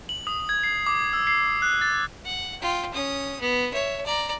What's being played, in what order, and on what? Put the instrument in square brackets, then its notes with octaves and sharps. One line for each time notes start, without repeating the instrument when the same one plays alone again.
[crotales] F#7
D#6
G#6
C7
D6
E6
C7
F#6
A6
[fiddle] F#5
F4 G5
C#4 D#6
B3
C#5 E5
D5 A#5